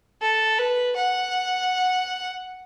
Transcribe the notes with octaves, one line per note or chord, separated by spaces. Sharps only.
A4
B4
F#5